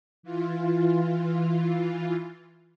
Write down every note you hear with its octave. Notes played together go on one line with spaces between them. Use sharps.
E3 F4